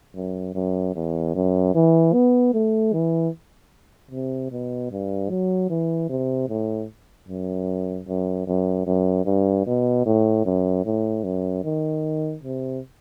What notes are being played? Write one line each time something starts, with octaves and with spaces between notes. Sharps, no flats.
F#2
F#2
E2
F#2
E3
B3
A3
E3
C3
B2
G2
F#3
E3
C3
A2
F#2
F#2
F#2
F#2
G2
B2
A2
F#2
A2
F#2
D#3
C3